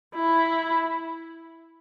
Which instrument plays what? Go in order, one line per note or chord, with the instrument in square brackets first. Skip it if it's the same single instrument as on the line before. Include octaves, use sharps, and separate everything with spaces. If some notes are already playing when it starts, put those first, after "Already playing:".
[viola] E4